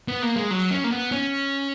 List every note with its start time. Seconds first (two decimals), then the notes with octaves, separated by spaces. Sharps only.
0.08 B3
0.22 A#3
0.36 G#3
0.51 F#3
0.71 C#4
0.84 A#3
0.91 B3
1.12 C#4